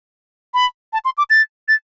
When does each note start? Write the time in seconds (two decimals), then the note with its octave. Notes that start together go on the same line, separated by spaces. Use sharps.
0.54 B5
0.93 A5
1.05 C6
1.18 D6
1.30 A6
1.68 A6